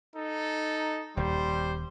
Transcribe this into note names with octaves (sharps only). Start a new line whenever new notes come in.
D#4 A4
D#1 D#2 G3 C5